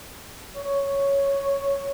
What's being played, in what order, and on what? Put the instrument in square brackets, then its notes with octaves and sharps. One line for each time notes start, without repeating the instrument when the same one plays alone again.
[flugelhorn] C#5